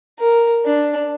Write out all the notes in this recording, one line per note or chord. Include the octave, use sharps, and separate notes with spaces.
A#4
D4